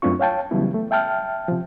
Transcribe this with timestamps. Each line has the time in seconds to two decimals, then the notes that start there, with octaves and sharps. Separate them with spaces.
0.02 F#2 A3 C4 D4 F4 C#6
0.20 C#5 F5 G5 A5
0.51 C#3 E3 F#3 G3 B3 E4
0.74 A3
0.91 E5 G5 A5 F6
1.48 C3 F3